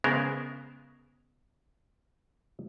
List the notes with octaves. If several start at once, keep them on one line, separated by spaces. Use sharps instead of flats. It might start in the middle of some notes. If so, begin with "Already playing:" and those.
C#3 G#3 B3 A#4 C5